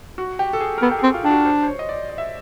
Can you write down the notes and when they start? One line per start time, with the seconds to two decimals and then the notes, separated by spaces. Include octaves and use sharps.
0.18 F#4
0.39 G4
0.53 A4
0.61 G#4
0.78 A#4
0.82 B3 A4
0.91 G4
0.99 C4 G#4
1.14 F4
1.24 D4 G4
1.30 F#4
1.45 C5
1.63 C5
1.68 C#5
1.79 D#5
1.89 D5
2.10 D#5
2.18 E5